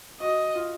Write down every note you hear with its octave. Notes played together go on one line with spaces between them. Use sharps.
F#4 D#5
F4